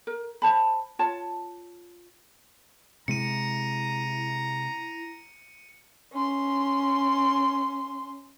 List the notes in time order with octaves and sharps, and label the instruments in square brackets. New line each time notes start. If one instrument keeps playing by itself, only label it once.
[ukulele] A#4
C5 A5 B5
F4 C#5 A5
[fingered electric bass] C3 G#3 [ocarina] E4 [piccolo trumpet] A#5 [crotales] C#7 D#7
[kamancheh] C#4 C6